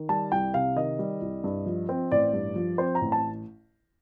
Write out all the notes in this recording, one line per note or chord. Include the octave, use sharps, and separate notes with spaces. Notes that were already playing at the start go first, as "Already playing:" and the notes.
Already playing: D#3
G3 A5
C2 G5
C3 F5
D#3 D#5
G3
C2
G2
F3
C4
A1 D5
G2
F3
C4 C5
A#5
A1
A5